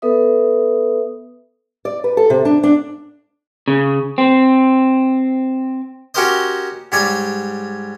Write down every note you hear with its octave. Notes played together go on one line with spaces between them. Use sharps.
B3 A4 B4 E5 D#6
D5
B4
A4
C3
D4
D4
C#3
C4
C#4 F#4 G4 A#4 C5 D#5
G#2 G3 C#5 D5 G#5